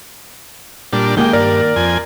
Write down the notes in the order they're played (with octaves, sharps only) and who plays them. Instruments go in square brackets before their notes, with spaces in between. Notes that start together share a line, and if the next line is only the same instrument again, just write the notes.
[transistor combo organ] A#2 G3 D4
[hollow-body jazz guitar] D#3 A#3 G4 [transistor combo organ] G#3 G5
[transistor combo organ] G2 [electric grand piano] A#4 D5
[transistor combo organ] F2 G#5